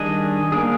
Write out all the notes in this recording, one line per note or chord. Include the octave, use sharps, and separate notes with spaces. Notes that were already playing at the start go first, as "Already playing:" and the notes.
Already playing: D#3 G3 D4 G#4 D#5
A#3 D4 G#4